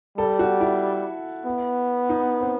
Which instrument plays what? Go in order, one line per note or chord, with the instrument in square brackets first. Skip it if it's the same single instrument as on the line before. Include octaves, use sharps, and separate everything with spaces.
[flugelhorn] G3 [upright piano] A4
[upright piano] F#4
E4
[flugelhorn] B3
[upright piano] D#4
C4